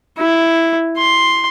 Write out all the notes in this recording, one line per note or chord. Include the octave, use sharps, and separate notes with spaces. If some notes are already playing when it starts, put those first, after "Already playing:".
E4
C6